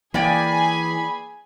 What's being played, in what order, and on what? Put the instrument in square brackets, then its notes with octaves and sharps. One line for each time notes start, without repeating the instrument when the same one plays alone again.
[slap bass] E3 [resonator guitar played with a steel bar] A#3 D5 G5 [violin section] G#4 G#5 [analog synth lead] B5